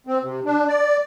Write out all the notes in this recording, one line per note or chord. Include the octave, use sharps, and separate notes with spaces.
C4
C3
D4
D5